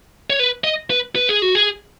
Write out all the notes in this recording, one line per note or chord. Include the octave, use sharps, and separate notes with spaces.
C#5
B4
D#5
B4
B4
G#4
F#4
G#4